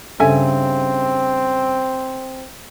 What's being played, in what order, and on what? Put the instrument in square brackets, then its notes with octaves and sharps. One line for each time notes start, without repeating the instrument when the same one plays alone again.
[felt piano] G2 C#3 [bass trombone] C4 [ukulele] A4 E5 G#5